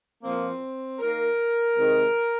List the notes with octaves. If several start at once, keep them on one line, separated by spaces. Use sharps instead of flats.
A#2 F3 A#3 C4
D#3 A#3 A#4
C3 D#3 G#3